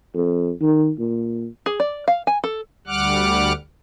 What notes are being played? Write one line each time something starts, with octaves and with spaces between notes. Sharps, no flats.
F2
D#3
A#2
G#4
D5
F5
G#5
A4
D2 G3 F#5 D6 F6 F#6